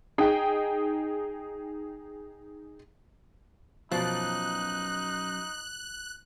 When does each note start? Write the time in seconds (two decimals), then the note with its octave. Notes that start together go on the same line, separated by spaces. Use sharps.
0.18 D#4 G#4 G5
3.91 F#2 B2 F3 D#4 D5 F#6